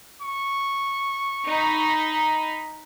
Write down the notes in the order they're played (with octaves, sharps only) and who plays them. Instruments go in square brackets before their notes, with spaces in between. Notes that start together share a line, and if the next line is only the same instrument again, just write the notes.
[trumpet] C#6
[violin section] D#4 B5